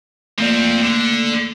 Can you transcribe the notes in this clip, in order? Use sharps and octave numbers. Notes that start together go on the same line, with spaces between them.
F3 A3 A#3 C4 D5
D3